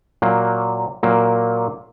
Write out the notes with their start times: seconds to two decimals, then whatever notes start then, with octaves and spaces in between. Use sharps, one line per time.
0.22 A#2 F#3 A#3
1.03 A#2 F#3 A#3